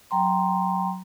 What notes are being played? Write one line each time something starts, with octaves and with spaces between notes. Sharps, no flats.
F#3 G5 A#5 C6